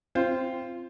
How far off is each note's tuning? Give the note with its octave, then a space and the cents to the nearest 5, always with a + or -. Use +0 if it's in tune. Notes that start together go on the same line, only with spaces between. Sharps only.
C4 +0 F4 -20 C5 +0